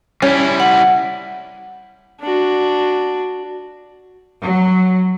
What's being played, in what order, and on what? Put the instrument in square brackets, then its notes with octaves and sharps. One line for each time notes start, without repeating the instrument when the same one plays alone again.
[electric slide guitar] G3 E4 [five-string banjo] C#4
[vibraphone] F#5
[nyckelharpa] D4 F#4
[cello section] F#3